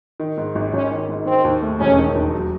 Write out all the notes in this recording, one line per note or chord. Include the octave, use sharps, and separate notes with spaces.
D#3
G#2
G#1
G#1 C#4
D#3
G#2
D#3 C4
D#2
A3
E1 C#4
D#3
D#2
F#3